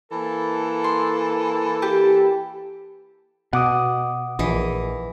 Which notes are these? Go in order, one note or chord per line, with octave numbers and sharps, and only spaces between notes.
E3 A#3 A4
C6
G4
B2 F#5 D6 D#6
A#1 E3 D#5